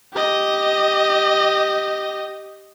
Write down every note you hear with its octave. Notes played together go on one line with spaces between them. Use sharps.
G4 D#5